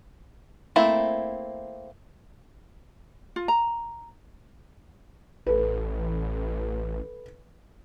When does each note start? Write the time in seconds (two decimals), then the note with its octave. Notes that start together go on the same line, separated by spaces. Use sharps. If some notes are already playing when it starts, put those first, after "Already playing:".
0.76 A3 A#3 C4 E4
3.36 F4
3.48 A#5
5.47 A1 A4 B4